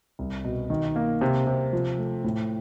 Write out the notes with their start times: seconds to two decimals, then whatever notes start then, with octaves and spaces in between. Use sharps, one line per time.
0.19 C2
0.44 B2
0.70 D#3
0.96 A#3
1.21 C3
1.47 C3
1.73 F3
1.99 A3
2.24 A2